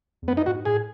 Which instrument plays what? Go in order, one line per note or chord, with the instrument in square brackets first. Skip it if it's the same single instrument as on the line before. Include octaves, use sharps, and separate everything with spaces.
[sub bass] E2
[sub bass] F#2 [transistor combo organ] B3
[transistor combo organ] D#4
[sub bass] G#2 [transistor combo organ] F#4
[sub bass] A2 [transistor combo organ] G#4